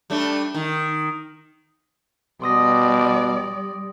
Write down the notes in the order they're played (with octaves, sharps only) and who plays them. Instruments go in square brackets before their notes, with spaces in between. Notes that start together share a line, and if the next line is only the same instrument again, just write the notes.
[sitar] G3 A3 D4
D#3
[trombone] B2 [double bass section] G3 [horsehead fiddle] D5 [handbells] C6 D#6 A#6